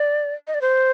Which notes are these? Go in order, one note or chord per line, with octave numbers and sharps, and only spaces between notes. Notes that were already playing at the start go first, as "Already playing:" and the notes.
Already playing: D5
D#5
D5
C5